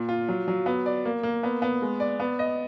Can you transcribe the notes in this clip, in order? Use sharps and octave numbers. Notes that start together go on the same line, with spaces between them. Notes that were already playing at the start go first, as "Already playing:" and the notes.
Already playing: A#2
F4
F#3
F#3
B3
D5
A#3
A#3
B3
B3
G#3
D5
B3
D#5